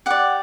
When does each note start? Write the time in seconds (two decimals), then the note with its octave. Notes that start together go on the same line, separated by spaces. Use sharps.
0.06 G4 D5 F#5